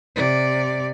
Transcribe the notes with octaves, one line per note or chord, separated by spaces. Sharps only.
C3 D5